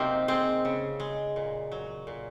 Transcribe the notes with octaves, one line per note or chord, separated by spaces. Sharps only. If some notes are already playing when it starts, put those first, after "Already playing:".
Already playing: C3 F#3 A#3 C4 D#4
G#3 C4
C#3
G#3
A#2
F#3
A#2